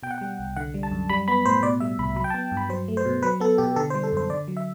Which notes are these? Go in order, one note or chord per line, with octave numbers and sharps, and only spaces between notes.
B2 G5
F#5
G3 G5
C2
D3 F#5
G3
A5
F#2
G3 B5
B3 B5
A2 C5
B2 D5
G3 E5
C2 B5
F#3 B5
G5
A5
B3
G2
B5
F#3 C5
A3
C5
B2
F#3 B4
B3 A4
B2 G4
D3 A4
C5
G3
A4
F#2 C5
D3 D5
F#3
E5